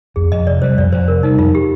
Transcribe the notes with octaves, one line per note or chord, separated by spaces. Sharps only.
F2 G#4
F2 D#5
C3 D5
G3 C5
F2 D5
F2 C5
C3 A#4
G3 D#4
F2 F4
G4